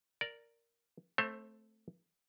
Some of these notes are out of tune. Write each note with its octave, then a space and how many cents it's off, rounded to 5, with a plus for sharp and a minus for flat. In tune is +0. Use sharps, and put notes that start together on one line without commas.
A#4 +0 D5 -5
A3 +0 C4 +0 C5 +35